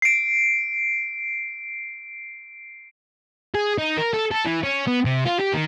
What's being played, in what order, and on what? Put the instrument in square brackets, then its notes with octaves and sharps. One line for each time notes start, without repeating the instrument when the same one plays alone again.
[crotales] C7 D7
[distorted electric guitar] G#4
D#4
A#4
A4
A4
E3
C#4
B3
C3
F4
G4
D#3